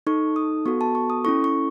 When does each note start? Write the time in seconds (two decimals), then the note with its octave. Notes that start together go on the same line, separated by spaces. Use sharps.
0.07 D#4 A4 C#6
0.36 D#6
0.66 B3 F#4 A4 C#6
0.81 A5
0.95 C#6
1.10 D#6
1.25 C#4 E4 A4 C#6
1.44 C#6